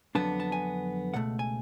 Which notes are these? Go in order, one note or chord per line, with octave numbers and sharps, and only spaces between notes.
F2 D3 F#3 B3 D4 A5
A5
G#5
C#2 B2 A3 F#5
G#5